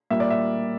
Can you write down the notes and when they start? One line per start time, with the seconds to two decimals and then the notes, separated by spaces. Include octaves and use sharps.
0.10 A#2 G3 A#3 E5
0.20 D5
0.30 E5